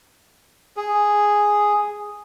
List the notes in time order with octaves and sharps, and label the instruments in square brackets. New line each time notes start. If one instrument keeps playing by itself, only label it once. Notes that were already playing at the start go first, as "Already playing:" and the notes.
[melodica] G#4